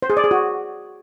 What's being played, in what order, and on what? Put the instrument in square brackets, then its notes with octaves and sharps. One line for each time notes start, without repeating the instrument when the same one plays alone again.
[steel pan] C5
G#4
D5
G#4
F#4